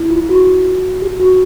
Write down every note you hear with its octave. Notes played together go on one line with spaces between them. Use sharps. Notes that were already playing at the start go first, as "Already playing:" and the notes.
Already playing: E4
F4
F#4
G4
F#4